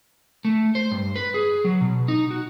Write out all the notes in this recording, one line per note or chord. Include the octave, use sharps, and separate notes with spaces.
A3
C5
G2
B4
G#4
F#3
B2
D#4
F#4